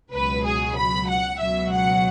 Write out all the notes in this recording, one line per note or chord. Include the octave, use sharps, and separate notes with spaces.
C#2 B2 F#3 B4
G#4
B5
F#5
C#2 B2 F#3 E5
F#5